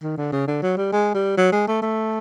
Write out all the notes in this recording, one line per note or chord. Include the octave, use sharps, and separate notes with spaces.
D#3
D3
C#3
D3
F#3
G3
G#3
G3
F#3
G#3
A3
A3